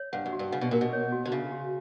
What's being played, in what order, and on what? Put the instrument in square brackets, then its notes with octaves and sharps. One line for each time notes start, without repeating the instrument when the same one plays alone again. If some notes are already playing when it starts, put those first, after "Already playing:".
Already playing: [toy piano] C#5
[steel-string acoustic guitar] G2 [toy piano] F#5
[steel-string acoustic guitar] F#2
[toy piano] F#4
[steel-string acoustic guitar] G2
[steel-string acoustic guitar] C#3 [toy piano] F#5
[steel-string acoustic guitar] B2
[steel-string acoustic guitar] A#2 [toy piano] A#4
[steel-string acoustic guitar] B2
[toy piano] C#5
F#4
[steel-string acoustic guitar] D3
[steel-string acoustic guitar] C#3 [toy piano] E5
[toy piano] F#4